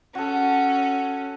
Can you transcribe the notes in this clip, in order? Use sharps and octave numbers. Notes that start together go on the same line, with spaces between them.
C#4 F#4 A4